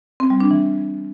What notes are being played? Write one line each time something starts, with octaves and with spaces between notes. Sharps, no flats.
C4
G3
D4
E3